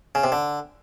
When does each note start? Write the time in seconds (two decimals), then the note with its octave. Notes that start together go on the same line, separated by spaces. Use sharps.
0.15 C#3
0.24 C3
0.32 D3